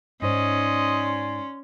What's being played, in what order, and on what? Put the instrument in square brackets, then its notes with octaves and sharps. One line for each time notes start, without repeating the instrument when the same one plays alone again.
[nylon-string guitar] G#2 D#4 C5 [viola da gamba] C#4 [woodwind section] D5 G#5 C6 [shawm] D#5